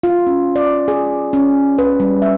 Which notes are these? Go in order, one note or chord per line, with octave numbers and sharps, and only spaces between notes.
F4
C#4
D5
G#4
C#4
B4
G3
E5